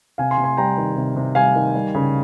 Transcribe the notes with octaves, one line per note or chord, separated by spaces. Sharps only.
C3 F5 G#5
G#5 C6
C3
G#5 C6
G3 G5 A#5
D#3
C3
C3
G3 F5 G#5
D#3
G3
C#3